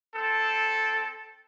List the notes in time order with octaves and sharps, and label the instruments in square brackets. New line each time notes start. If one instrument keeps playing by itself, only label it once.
[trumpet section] C4 A4